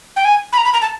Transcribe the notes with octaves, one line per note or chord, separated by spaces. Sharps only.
G5
G#5
B5
A#5
B5
A#5
A5